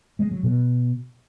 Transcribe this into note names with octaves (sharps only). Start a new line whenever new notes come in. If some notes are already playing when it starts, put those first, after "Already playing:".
G#3
F#3
B2